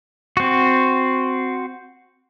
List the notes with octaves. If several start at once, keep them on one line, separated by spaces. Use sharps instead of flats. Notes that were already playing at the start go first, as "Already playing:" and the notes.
C4 F#4